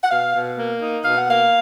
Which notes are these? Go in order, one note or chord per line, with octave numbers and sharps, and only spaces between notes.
F#5
B2 F5
B2
A#3
D#4
B2 F5
F#5
A#3 F5